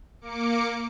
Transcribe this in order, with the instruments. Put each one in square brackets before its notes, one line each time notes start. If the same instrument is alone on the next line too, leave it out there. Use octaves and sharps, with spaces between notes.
[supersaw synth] A#3 D6 C#7